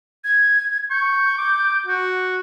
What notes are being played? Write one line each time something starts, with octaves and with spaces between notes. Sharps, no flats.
G#6
C#6 G6
D6
F#4